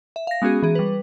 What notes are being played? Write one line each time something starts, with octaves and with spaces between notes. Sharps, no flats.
E5
F5 A#6
G#3 B3 C#4 F#4 G#4
E3 G#4
G3 B4